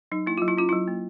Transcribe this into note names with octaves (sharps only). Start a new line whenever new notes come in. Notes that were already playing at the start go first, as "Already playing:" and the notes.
F#3 D#4
A#3 E4
F#3 F4
E4
C#4 F4
F#3 E4
A#3